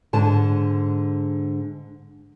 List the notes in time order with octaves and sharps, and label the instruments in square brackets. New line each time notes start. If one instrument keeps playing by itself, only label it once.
[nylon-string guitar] G#2 D3 A5